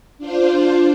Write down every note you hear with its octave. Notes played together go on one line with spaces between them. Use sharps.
D4 F4 C5